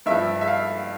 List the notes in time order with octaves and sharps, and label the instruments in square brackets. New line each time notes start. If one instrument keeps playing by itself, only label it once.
[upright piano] G2 F3 E5
E5
F5